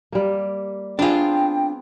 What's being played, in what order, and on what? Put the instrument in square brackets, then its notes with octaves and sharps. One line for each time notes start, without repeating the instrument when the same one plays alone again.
[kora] G3 A#3
[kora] B3 C4 G#4 [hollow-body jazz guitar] D4 F4 [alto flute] G5